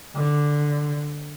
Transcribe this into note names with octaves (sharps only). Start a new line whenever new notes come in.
D3